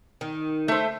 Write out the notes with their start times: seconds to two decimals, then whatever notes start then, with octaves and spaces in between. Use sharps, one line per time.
0.21 D#3
0.68 A3 C5 E5